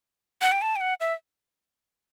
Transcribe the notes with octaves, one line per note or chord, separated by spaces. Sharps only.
F#5
G5
A5
G5
F#5
E5